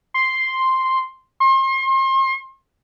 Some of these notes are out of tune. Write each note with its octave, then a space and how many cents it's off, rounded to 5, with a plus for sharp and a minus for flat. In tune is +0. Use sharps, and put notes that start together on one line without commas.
C6 +0
C6 +35